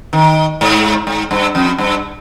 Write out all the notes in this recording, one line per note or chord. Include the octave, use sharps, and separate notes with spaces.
D#3
G#2
G#2
G2
F2
G2